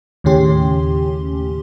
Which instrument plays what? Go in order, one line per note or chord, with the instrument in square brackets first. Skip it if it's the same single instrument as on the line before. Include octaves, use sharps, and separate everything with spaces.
[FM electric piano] D#2 A2 C#3 C#4 G4 C6